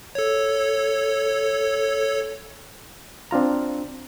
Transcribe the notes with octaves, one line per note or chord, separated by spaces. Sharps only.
A4 C#5
C4 D4 F4 A#5